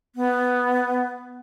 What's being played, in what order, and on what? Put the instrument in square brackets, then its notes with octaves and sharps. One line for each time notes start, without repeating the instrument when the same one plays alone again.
[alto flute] B3